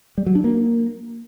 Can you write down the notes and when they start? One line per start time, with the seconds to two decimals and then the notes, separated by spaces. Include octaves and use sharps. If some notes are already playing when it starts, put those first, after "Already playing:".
0.18 G3
0.26 F#3
0.35 D4
0.44 A#3